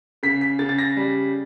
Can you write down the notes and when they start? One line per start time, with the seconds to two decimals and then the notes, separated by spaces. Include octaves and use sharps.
0.23 C#3 B6
0.41 B6
0.59 C#3 A6
0.69 A6
0.78 A#6
0.97 G3